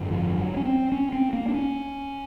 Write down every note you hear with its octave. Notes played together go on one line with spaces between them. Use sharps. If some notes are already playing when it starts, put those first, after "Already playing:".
Already playing: G#1 F#2 D3
F3
F#3
C#4
C4
C#4
C4
A#3
D4
C#4